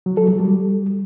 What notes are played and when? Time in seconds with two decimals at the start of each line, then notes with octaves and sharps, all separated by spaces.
0.06 F#3
0.17 A4
0.28 F#3
0.40 G3